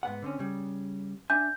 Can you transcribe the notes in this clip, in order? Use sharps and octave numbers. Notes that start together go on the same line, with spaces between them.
G#2 B3 F#5
D3 C4 C#4
C#3 G3
D4 E5 G#5 G6